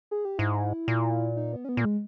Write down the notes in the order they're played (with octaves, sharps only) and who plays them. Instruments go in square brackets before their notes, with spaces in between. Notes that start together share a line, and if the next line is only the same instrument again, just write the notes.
[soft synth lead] G#4
G4
[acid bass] G#2 [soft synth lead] E4
[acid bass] A#2
[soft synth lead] D#4
B3
C#4
B3
[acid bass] A#2
[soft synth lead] A#3
G#3